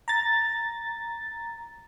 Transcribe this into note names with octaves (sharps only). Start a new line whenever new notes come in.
A#5 A6